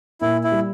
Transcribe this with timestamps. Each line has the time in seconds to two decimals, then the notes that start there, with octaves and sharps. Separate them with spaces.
0.21 A#2 E4
0.44 E4
0.52 G3